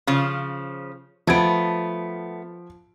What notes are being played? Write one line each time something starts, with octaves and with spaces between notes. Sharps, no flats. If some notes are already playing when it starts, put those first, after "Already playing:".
C#3 F3
F3 A3 B3 G#6 D7